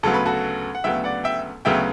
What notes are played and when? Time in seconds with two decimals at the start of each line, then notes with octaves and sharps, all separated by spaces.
0.03 D2 C#3 F#3 B3 A4
0.14 B4
0.26 F#4 A4
0.75 F#5
0.84 D2 C#3 F#3 B3 E5 G5
1.04 D5 F#5
1.24 E5 G5
1.65 D2 C#3 F#3 B3 E5 G5